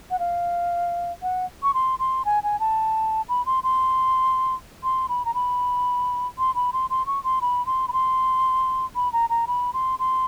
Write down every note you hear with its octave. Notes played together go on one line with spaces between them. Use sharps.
F#5
F5
F#5
C#6
C6
C6
G#5
G#5
A5
B5
C6
C6
C6
B5
A#5
B5
C6
B5
C6
C6
C#6
C6
B5
C6
B5
C6
B5
A#5
A#5
B5
C6
C6